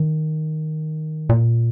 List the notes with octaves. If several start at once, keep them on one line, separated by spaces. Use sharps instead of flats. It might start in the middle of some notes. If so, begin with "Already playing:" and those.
Already playing: D#3
A#2